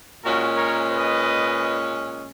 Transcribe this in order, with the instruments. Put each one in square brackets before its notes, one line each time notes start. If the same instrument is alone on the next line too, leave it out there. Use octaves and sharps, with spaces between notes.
[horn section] A#2 G#3 C#4 F#4 A#4
A#4 C#5
B4 D#5